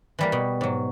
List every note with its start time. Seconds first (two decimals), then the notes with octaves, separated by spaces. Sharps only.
0.19 E3 G3 A#3
0.32 B2
0.61 G#2 F#3